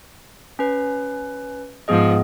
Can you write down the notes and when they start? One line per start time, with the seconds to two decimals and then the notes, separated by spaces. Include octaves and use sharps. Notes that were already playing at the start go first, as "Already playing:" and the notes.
0.59 C#4 B4
1.88 G#2 F3 B3 G#4 D#5